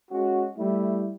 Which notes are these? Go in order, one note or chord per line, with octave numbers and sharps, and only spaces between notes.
G#3 C#4 F#4
G3 A3 E4